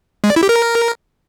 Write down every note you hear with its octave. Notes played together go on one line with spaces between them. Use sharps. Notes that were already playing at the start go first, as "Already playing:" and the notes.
G#3
D5
E4
G4
A#4